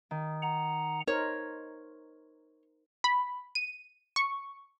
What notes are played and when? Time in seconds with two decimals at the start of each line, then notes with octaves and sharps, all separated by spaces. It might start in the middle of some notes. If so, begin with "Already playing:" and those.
0.11 D#3
0.42 F#5 A#5
1.08 D#4 A#4 C5 C#5
3.04 B5
3.55 D#7
4.16 C#6